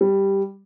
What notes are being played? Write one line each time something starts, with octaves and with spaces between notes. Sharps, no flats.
G3